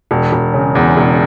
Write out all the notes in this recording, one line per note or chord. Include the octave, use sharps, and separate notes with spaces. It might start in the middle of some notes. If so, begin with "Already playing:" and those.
E1
E1
C#3
E2
E1